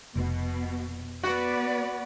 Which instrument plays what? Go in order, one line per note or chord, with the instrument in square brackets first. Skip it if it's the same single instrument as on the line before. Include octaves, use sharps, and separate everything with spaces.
[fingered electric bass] F1 [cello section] B2
[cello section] B3 B4 D5 [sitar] F#4